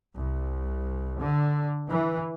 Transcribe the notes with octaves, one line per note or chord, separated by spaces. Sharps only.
C2
D3
E3